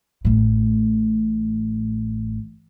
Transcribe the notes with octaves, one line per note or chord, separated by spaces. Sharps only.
A1 A2